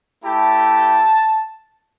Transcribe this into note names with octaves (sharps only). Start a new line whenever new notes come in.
A3 E4 G4 A5